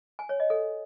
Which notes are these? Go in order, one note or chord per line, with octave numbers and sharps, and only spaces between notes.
G#5
C#5
D#5
A4